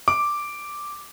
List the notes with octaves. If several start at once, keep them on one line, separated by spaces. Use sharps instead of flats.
D6